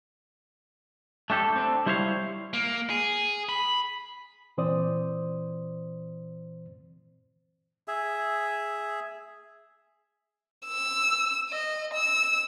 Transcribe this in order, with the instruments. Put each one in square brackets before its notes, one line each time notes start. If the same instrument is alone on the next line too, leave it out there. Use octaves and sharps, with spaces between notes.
[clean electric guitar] A3 D4 G4 A4
C4 D4 A4
G3 E4 C5 C#5 E5 F5
[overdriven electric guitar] A#3
G#4
B5
[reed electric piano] A#2 E3 C4 C5 D5 D#6
[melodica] G#4 E5
[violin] E6
D#5
E6